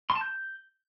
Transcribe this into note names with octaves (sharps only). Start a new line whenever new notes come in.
C6
A5
G6